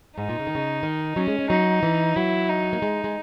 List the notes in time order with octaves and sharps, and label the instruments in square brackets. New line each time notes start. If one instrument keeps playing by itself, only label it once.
[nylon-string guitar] G#2 [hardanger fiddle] D#4
[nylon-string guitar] A#2
C#3
D#3
C#3
D#3
[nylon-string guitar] F#3 [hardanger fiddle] C#4
[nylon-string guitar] G#3
G#3
[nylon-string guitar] F#3 [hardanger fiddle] D#4
[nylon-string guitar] E3
[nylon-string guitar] F#3 [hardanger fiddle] E4
[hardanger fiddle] D#4
[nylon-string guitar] A#3
G#3
G#3